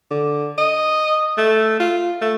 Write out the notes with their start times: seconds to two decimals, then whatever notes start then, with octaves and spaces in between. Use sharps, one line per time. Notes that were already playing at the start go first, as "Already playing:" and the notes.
0.11 D3
0.58 D#5
1.37 A3
1.80 F4
2.21 A3